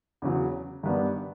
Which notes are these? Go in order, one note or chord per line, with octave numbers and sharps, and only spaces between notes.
E2 C#3 F#3
G2 D#3 G3 B3 D4